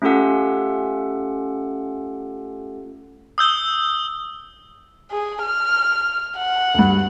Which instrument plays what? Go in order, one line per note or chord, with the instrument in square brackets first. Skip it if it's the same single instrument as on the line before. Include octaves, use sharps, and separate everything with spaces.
[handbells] A3 C#4 F4 G4 A4 F#5
[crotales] D#6 E6 G6 G7
[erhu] G#4
F6
F#5
[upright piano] D2 G2